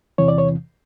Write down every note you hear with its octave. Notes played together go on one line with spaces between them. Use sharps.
E2 C3 E3 C#5
D5
C#5